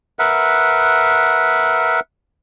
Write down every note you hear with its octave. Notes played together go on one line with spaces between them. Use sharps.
A#4 B4 E5 F#5